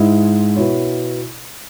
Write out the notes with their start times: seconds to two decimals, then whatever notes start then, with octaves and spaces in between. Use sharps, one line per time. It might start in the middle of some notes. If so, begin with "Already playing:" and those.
Already playing: G#2 G#3 E4
0.56 B2 B3 E4 C#5